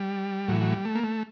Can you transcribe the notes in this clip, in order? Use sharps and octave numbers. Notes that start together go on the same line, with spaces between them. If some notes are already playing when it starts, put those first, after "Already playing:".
Already playing: G3
A2 E3 F#3
F#3
G3
A3
A#3
A3